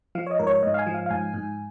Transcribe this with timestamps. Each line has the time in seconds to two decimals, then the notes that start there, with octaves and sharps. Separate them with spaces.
0.15 F3 F5
0.27 C#5
0.31 D#5
0.39 G#2 A#4
0.47 C#5
0.62 G#2 D#5
0.74 F5
0.79 G#5
0.87 F3
0.94 F5
1.06 F5
1.10 G#2 G#5
1.34 G#2